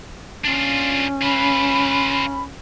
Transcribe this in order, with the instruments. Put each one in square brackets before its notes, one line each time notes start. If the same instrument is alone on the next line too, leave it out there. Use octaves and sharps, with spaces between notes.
[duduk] C#4 [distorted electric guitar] D4 F4
[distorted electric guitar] F4 B4 [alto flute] B5